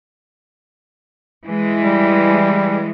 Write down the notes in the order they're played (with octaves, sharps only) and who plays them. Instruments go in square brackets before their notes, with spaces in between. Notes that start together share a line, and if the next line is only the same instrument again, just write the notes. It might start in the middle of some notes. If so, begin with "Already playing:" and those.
[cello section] E3 G#3
[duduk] G3